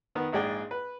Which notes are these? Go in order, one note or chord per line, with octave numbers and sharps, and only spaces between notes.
D#3 B3
A#1 G#2 G#4 D5 G5
B4